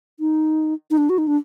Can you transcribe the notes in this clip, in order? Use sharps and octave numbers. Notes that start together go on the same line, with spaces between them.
D#4
D#4
D4
F#4
D#4
D4